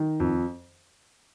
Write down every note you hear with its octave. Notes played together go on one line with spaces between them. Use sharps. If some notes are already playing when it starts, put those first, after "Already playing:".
Already playing: D#3
F2